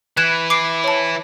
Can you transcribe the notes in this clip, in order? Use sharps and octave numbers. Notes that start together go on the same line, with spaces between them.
E3 E4 F#6 G#6 E7
D6 C7 D7
C#5 A5